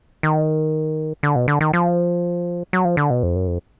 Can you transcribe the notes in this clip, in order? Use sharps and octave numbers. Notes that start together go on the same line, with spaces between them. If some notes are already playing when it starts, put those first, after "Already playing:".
D#3
D3
B2
D3
D#3
F3
F#3
F3
D3
B2
F2
F#2
F2